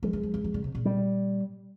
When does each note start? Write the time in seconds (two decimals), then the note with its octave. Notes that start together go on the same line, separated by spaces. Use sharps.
0.03 F3 G#3
0.13 E3
0.23 F3
0.34 E3
0.44 E3
0.54 D3
0.64 C3
0.75 A#2
0.85 G3